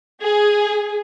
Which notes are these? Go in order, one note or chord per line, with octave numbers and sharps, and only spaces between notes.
G#4